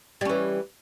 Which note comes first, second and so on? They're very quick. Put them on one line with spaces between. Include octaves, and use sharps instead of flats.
G3 C#4 E3